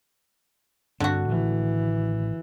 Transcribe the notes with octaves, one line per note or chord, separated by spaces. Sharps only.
G2 D3 C4 F#4
A1 A2 D#3 E3